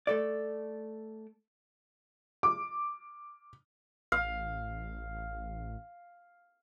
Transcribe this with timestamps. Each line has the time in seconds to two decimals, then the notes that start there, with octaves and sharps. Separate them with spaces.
0.07 A3 A4 D5
2.43 D6
4.12 A1 F5